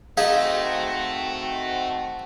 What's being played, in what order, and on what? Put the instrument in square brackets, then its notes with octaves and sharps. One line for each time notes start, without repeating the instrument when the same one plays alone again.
[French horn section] D#3 C4 F#4 [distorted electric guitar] A3 [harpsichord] D#4 G#4 [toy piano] F5